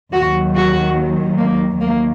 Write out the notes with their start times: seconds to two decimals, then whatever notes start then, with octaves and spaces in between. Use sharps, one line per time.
0.13 D#2 D#3 F#3 F#4
0.55 F#4
1.38 A#3
1.80 D#2 D#3 F#3 A#3